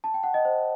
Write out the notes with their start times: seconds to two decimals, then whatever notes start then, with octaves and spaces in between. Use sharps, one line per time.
0.04 A5
0.14 G5
0.23 F#5
0.34 D#5
0.45 C5